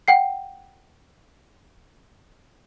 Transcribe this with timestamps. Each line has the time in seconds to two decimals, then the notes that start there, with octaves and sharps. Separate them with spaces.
0.08 F#5 G5 C7